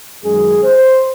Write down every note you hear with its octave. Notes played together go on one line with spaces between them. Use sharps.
F#2 D#3 G#3 G#4
C5